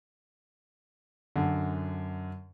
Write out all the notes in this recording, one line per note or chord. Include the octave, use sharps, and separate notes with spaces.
F#2 D3